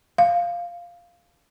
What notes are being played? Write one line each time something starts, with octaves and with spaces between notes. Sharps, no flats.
F5